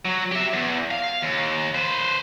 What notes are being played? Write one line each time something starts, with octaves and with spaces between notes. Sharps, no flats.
F#3
G4 E5
E2
F5
D#2
B4 C5